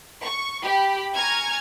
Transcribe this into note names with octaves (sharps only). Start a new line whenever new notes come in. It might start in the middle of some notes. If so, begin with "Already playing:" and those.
C#6
G4 B5
G#5 A#5 C#6 F6 G#6